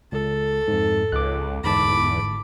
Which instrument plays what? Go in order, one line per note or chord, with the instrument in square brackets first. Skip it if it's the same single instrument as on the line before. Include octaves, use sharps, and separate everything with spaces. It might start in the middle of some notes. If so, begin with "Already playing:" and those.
[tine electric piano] C#2 [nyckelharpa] A4
[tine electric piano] F2 G#2
[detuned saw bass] C#2 [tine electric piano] D6 F#6
[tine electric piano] G1 G#2 A5 [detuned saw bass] E2 [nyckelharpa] B5 D6